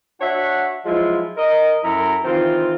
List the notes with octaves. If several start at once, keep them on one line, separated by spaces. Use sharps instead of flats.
D4 F#4 C#5 E5 F#5
F3 F#3 G#3 E4 F4
A#4 D#5
F#2 F#3 E4 A4 A#4 A#5
D#3 E3 C4 F4